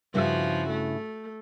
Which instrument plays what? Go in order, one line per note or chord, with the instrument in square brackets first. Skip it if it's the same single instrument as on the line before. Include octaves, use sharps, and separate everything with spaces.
[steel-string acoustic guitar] G2 C#3 E4 [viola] F3 F#4
[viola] A3